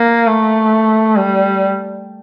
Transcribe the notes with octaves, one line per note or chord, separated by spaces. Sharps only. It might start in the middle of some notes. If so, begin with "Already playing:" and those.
Already playing: A#3
A3
G3